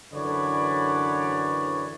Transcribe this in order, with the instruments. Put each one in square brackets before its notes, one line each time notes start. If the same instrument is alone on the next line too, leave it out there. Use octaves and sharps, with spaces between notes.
[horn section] F#2 D3 E3 B4 C#5 D5